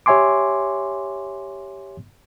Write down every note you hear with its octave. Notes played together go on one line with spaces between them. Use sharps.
G4 C#5 E5 G#5 C6 D6